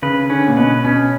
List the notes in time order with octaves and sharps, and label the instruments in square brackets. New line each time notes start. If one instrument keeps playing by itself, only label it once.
[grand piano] C#3 [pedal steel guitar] B4
[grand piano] D3 [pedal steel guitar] C#4
[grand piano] A#2
[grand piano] B2 [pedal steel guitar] B4
[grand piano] B2 [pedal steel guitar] C#4